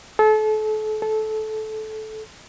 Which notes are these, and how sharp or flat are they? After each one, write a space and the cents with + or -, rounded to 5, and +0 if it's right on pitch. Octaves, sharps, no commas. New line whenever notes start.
A4 -35
A4 -20